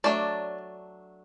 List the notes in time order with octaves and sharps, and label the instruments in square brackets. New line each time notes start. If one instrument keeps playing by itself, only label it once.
[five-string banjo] F#3 A3 D4 D5